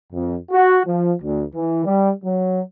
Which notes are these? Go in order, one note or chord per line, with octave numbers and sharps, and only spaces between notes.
F2
F#4
F3
D2
E3
G3
F#3